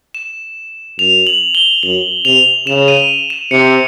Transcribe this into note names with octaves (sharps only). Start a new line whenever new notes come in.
E7
F#2 F7
F#7
G7
F#2 F#7
C3 F7
C#3 E7
D#7
E7
C3 C#7